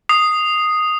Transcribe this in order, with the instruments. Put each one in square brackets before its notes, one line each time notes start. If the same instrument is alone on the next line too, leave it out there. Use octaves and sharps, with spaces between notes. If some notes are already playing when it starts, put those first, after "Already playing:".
[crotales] D#6 C7